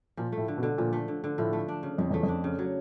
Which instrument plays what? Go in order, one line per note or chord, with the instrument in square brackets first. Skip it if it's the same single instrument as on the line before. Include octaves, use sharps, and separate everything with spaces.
[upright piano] A#2 [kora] F3
[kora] A3
[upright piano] A2
[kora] D3
[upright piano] B2
[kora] D3
[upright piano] A#2 [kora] F3
[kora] A3
D3
D3
[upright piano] A2 [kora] F3
[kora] A3
D4
C#3
[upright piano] F2 [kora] F3
[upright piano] E2 [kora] A3
[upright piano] F2
[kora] D4
C#3
F#3